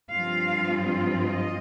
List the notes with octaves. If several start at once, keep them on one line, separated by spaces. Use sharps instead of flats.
G2 F3 C4 F4 F5
D#5